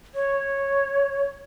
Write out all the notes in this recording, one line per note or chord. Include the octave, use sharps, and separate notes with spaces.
C#5